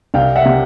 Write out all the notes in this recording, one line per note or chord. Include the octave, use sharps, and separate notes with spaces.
C2 F5 G5
E5 F#5
C3